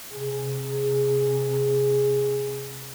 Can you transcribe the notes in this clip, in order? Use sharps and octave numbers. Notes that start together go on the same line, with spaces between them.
C3 G#4